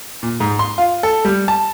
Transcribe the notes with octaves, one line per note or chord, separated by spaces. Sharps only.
A#2
G#2
C6
F4
A4
G3
A5